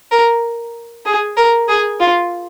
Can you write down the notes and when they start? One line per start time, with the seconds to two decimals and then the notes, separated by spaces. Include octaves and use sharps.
0.11 A#4
1.06 G#4
1.37 A#4
1.69 G#4
2.00 F4